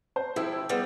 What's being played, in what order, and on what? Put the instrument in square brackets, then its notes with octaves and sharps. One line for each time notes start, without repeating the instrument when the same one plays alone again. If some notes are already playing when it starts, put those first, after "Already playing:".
[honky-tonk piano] C5
[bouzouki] F3 G4 [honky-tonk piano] E4
[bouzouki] G3 G#4 C5 [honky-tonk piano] B3